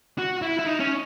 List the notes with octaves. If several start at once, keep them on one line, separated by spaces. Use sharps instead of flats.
F#4
E4
E4
D#4
C#4